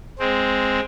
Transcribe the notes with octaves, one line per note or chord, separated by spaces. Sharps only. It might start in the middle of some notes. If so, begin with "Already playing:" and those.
G#3 C4